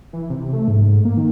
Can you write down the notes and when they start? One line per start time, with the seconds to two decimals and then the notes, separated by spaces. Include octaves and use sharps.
0.13 E3
0.30 C3
0.53 A3
0.68 G#2
0.81 G#2
1.05 A#3
1.17 D#3